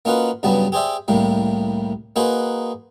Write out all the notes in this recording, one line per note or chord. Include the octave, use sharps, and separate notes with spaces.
A#3 C#4 D#4 F4 F#4 B4
G2 C#3 F#3 G3 B3 A5
G4 G#4 C5 D5 E5
C2 A2 G3 A#3
A#3 D#4 F#4 G#4 B4 C5